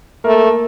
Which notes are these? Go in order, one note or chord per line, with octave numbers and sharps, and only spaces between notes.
A3 A#3 A#4